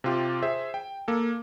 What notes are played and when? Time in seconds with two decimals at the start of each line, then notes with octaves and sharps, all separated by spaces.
0.04 C3 F4 G4
0.42 G#4 C5 E5
0.74 G5
1.08 A#3 A4